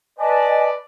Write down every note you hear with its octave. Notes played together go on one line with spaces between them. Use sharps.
B4 D5 D#5 G#5 A5